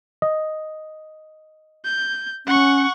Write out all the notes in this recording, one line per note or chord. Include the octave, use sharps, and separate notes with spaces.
D#5
G6
C#4 F#5 C#6